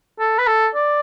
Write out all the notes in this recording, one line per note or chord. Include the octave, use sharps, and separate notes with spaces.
A4
B4
A4
D5